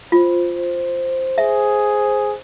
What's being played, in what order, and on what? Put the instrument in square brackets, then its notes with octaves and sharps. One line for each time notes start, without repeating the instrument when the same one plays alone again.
[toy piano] F4 [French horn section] C5
[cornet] G#4 [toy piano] E5